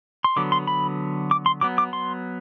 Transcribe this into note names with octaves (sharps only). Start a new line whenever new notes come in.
C6
D3 F#3 B3 D6
C6
B5
D6
C6
F#3 B3 D6
D6
C6